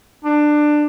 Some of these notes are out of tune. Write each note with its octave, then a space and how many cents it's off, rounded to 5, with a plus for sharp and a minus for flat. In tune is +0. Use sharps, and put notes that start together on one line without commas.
D4 +20